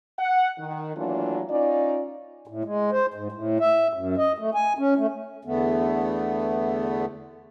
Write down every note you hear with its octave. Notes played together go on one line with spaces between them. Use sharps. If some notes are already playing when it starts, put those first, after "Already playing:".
F#5
D#3
E3 F#3 A3 A#3 D4 F4
C#4 D#4 F4 D5
A2
G#3
C5
G#2
A2
E5
F#2
D#5
A3
G#5
C#4
A3
E2 D3 A3 B3